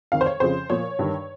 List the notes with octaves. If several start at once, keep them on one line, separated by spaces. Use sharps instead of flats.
F2 D#3 F5
C5
C#5
F2 C#3 F3 C5
A#2 F3 C#5
G2 D#3